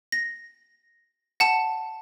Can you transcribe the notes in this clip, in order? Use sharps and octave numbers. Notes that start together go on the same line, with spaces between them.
A#6
F#5 A5